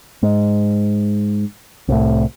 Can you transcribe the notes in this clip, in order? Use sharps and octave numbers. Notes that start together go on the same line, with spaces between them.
G#2
C2 A2